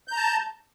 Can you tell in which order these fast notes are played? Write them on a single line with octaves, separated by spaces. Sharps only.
G6 A#5 A5